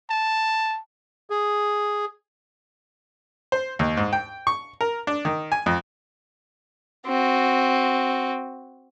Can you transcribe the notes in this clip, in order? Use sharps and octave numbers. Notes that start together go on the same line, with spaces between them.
A5
G#4
C5
D#2
G#2
G5
C#6
A#4
D4
D#3
G#5
F2
C4 F#4